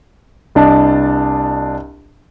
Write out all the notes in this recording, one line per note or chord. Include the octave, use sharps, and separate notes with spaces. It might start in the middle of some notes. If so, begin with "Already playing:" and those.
C2 D4 D#5 A5